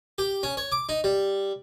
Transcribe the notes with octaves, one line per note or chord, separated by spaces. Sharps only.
G4
C#4
C#5
D6
D#4
G3